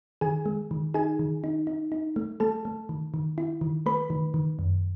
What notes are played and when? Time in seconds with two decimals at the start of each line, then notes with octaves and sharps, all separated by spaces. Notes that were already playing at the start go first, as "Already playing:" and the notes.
0.21 D#3 G#4 G#5
0.46 G#3
0.71 D#3
0.94 D#4 G#4 G#5
1.19 D#3
1.44 D#4
1.67 D#4
1.92 D#4
2.16 A3
2.40 A3 A4 A5
2.65 A3
2.89 D#3
3.14 D#3
3.38 E4
3.61 D#3
3.86 A3 B4 B5
4.10 D#3
4.34 D#3
4.59 F#2